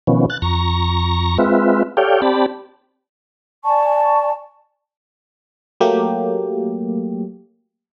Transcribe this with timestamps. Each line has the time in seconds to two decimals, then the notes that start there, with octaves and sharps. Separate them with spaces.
0.07 B2 D#3 F3 B3 C#4
0.30 F#6 A6
0.42 F2 A#5 C#6 A#6
1.38 G#3 C4 F4 B4 E5
1.97 G4 A4 C#5 D5 F5 G5
2.22 C4 G4 D5 A5 B5
3.64 D5 G#5 A5 C#6
5.80 F#3 A3 A#3 G4